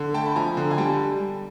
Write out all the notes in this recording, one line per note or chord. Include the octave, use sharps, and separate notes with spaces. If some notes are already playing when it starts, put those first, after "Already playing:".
Already playing: D3
A3 G5 A5
B5
F3 G#5 A#5
D3
G#5
G3 G5 A5